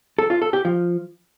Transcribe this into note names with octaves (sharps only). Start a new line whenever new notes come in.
A4
F4
A4
G4
F3